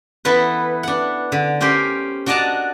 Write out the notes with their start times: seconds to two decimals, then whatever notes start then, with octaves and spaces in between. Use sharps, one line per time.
0.25 E3 B3 E4 A4 B4
0.83 D4 F#5
1.32 D3
1.61 C#4 G4 A#4 C5
2.26 D4 F#4 D5 D#5 A5 A#5